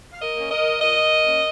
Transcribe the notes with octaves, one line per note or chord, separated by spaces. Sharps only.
F5
A#4 D#5
A#3 C#4
A#4 D#5
A#2 A#4 D#5
A#3 C#4